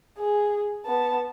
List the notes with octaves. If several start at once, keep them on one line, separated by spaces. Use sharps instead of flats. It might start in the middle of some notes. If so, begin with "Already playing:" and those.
G#4
B3 A5